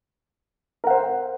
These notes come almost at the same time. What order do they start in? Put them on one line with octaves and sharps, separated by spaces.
A#4 F#5 C5